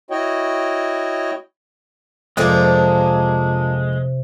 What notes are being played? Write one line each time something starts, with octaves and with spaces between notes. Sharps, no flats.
E4 F#4 C#5 D#5 G5
F2 C3 F3 G#3 A#3 D4